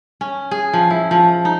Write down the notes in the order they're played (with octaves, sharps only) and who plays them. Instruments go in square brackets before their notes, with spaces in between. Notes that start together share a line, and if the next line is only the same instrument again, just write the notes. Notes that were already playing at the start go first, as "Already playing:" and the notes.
[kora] C#4
G#4
F3
E4
F3
D#4